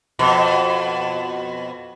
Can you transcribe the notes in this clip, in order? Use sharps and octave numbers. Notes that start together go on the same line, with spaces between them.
F2 B2